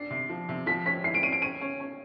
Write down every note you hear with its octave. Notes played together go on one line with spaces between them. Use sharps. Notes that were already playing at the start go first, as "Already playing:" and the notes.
Already playing: D4 C7
C3
F3
C3
F3 B6
C#4 B6
E4 C7
D7
C#4 D#7
D7
C#4 D#7
C#4
C#4